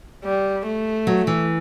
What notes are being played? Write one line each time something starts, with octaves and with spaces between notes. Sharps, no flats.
G3
A3
F#3
E3